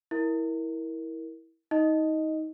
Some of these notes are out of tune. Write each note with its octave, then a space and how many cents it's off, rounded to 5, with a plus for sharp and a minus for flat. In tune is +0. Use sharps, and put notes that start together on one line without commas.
E4 -15 A#4 +0
D#4 +25 D#5 +0